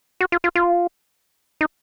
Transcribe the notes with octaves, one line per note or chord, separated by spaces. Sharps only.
F#4
F4
F4
F4
D#4